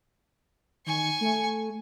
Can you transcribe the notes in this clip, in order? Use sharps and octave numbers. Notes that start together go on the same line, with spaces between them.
D#3 G#5 C#6
A3